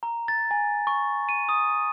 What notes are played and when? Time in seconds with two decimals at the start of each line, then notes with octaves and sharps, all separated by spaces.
0.03 A#5
0.28 A6
0.51 G#5
0.87 C#6
1.29 D#7
1.49 D#6